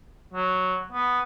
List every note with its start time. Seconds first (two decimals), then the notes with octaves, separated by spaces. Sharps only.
0.33 F#3
0.92 B3